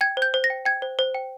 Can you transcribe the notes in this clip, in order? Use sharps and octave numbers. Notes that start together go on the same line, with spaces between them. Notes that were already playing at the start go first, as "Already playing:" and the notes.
G5 G#6
C5 G6
C5
A#6
G5
G5 G#6
C5
C5
G5